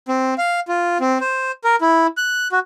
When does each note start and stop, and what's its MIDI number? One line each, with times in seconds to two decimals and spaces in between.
0.08 0.34 60
0.38 0.60 77
0.68 0.98 65
1.00 1.18 60
1.21 1.52 72
1.64 1.76 70
1.81 2.07 64
2.17 2.48 90
2.52 2.59 66